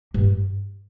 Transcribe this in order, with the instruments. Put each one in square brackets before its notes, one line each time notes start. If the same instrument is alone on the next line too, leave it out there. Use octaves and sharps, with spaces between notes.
[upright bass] G2